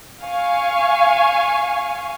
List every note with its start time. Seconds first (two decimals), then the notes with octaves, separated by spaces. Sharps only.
0.22 F5 G#5 C#6